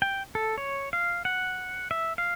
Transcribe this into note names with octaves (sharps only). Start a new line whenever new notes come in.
G5
A4
C#5
F5
F#5
E5
F5